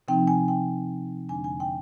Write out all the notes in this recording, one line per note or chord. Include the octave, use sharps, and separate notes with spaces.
C3 F3 C4 D#4 G5
G#5
G5
F2 D3 G#3 D4 G#5
G#5
G5